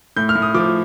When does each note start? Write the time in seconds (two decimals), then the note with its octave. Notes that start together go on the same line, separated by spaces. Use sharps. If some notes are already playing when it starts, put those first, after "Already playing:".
0.17 A2 G6
0.29 F6
0.35 A2
0.42 D#6
0.54 F3 D6